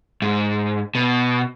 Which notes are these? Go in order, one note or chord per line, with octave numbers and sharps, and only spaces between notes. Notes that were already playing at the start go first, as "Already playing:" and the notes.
G#2
B2